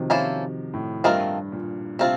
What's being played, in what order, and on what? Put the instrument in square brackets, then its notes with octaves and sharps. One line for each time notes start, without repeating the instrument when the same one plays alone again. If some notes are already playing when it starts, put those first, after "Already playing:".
Already playing: [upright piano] C3 D#3 F3 F#3
[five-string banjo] A#3 C#4 E4 A4 C5
[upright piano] A2
[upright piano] G2 [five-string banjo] A3 C4 F4 A#4 D#5
[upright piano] A#2
[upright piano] C3 [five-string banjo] A3 C4 F4